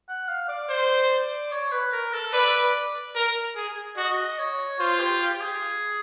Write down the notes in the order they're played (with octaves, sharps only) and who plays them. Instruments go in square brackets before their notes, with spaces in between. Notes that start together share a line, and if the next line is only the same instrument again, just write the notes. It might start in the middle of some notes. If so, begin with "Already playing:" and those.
[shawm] F#5
F5
D5
[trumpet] C5
[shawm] C#5
B4
A#4
A4
[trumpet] B4 [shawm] D5
[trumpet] A#4
G#4
[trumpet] F#4 [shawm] D#5
[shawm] C#5
[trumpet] F4 [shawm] C5
[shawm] G4
G4
G4
G#4